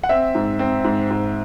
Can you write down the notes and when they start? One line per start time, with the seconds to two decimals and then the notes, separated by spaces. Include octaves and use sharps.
0.03 F#5
0.09 C4 E5
0.35 G#2
0.59 C4
0.84 G#2
1.10 G#2